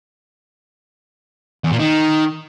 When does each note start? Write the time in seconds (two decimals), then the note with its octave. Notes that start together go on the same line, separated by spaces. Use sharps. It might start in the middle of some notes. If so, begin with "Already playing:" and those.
1.64 E2
1.72 A#2
1.79 D#3